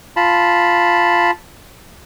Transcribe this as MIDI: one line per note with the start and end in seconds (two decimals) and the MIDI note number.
0.17 1.31 65
0.17 1.31 81
0.17 1.31 83